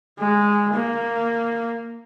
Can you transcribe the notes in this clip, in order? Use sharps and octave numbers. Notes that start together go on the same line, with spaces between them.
G#3
A#3